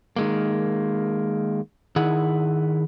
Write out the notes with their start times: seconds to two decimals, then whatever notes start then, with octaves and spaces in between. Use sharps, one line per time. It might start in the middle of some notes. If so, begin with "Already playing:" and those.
0.16 D#3 G#3 A#3
1.96 D#3 E4 G#4 F#5